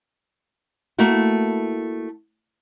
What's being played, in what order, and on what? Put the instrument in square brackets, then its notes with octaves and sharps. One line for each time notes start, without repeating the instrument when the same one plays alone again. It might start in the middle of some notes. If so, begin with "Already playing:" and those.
[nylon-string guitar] A3 A#3 E4 F#4